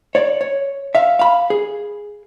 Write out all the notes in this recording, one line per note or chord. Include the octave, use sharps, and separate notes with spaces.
C#5 D5
C#5
E5 F5
F5 B5
G#4